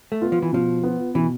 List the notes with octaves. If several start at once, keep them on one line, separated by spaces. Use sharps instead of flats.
A3
B3 F4
F3
E3
B2 F3
B3 F4
B2 E3